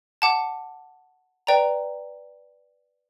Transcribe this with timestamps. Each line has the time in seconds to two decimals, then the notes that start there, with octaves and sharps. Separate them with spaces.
0.22 F#5 A5 D6
1.47 B4 D5 G5 A#5